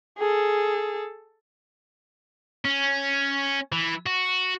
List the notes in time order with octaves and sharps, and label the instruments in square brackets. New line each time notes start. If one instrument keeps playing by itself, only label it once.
[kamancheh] G#4 A4
[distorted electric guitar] C#4
E3
F#4